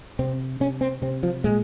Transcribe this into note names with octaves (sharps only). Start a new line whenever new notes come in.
C3 C4
C3 C#4
C4
C3 C4
F3
A#2 G#3